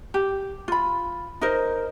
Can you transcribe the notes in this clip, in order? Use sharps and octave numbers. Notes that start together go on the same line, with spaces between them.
G4
F4 B5
D#4 A#4 C5 D#5